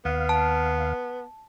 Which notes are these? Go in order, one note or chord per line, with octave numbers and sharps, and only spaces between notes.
D#2 B3 F5
A5